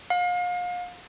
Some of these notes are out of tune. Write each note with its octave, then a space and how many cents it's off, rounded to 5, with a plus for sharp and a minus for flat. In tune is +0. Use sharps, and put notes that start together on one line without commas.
F5 +35